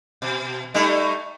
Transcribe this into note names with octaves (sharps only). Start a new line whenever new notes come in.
B2
G3 A3 D#4